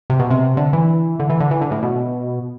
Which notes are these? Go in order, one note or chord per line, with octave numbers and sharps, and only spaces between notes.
C3
B2
C3
D3
E3
D3
E3
D3
E3
D3
A2
B2